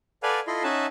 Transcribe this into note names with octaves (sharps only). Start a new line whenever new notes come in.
A4 B4 D5 F5 F#5 G#5
E4 F4 A4 D#5 B5 C6
C#4 D#4 E5 F#5 G#5 A5